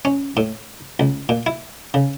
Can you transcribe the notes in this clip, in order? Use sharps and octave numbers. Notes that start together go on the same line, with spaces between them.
C#4
A2
C#2
A#2
E4
C#3